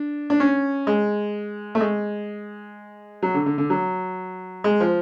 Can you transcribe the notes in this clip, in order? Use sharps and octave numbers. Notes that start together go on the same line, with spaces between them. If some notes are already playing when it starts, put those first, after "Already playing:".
Already playing: D4
D4
C#4
G#3
A3
G#3
F#3
D3
D3
D3
F#3
G#3
F3